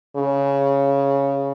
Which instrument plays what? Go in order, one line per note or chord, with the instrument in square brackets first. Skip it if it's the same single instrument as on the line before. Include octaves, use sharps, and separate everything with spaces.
[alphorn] C#3